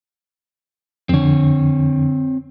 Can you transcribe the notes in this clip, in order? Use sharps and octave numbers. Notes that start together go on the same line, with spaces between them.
F2 D3 C4 C#5